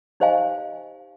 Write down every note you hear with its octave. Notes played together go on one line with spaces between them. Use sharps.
D#4 G4 C5 D#5 F5 G#5